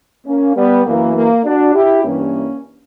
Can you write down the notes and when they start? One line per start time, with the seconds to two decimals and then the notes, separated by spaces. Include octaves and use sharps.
0.26 A#3 C#4
0.56 G3 B3
0.86 F#2 E3 A#3
1.16 A#3
1.45 D4 F#4
1.74 E4 G4
2.05 G2 E3 A#3 C#4